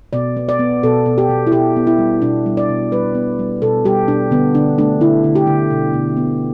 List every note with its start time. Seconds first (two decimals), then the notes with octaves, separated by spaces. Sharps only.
0.13 B2 D5
0.37 B3
0.49 D5
0.59 B3
0.83 B2 A4
1.06 B2
1.18 G4
1.30 B2
1.47 E4
1.52 B2 G4
1.76 B3
1.87 E4
1.98 G3
2.22 B2 D4
2.46 G3
2.57 D5
2.69 B2
2.92 G3 B4
3.15 B3
3.39 G3
3.62 B2 A4
3.85 G3 G4
4.08 B2 D4
4.31 D3 B3
4.55 D3 D4
4.78 A3 D4
5.01 D3 E4
5.24 D3
5.35 G4
5.47 D3
5.71 B2
5.93 B2
6.17 B3